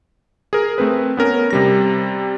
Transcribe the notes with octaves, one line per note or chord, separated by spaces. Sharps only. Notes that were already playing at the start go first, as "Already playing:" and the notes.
G#4 A#4
A3 C4 B4
B3 C#4 A#4
C3 G3 A#6